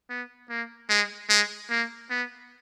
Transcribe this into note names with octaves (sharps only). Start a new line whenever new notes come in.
B3
A#3
G#3
G#3
A#3
B3